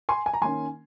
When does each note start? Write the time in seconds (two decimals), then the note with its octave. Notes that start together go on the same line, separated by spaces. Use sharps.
0.09 G#5 C6
0.26 G#5
0.34 A#5
0.41 D#3 A#3 C#4 G#5 C6